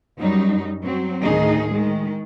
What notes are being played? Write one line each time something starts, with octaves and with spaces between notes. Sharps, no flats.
F#2 F#3 G3 D#4
F#3 C4
D2 A2 D#3 D#4 G#4
D#3 G#3